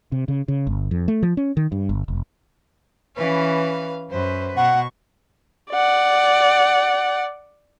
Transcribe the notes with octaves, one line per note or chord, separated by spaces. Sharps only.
C3
C#3
C#3
G1
F2
A3
F3
C#4
D#3
G2
G1
F1
E3 C#4 B4 F5
F#2 B4 C5
B2 F#5 C#6
D5 F#5